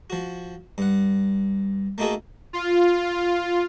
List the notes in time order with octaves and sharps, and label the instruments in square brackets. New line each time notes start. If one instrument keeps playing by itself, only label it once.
[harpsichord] F3 F#4
G2 F#5
A3 A#3 D#4 F#4 G#4 A4
[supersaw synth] F4